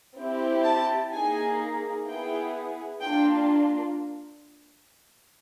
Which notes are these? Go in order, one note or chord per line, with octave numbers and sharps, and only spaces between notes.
C4 E4 G4
A5
A#3 D#4 G#4 G#5
B3 E4 G#4 G5
A#3 D4 F4 G5